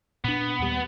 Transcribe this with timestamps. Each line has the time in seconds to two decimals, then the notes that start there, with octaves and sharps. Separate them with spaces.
0.24 A#2 B3 D4
0.59 D#2 A#2 G3